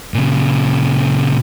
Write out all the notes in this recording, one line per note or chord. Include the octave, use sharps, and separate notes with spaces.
A#2 C#3